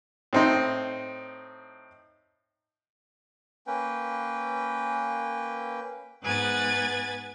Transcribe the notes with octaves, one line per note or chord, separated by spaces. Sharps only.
A2 C4 D#4
A#3 C#4 B4 G5
G#2 B3 B4 G#5 G#6 A6